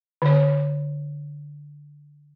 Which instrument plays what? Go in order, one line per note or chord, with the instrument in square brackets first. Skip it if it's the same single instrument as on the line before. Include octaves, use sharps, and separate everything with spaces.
[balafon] D3 C#5